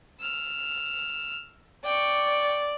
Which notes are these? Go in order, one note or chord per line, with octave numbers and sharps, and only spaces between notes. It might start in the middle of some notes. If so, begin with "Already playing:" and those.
E6 F6
D5 G5 C#6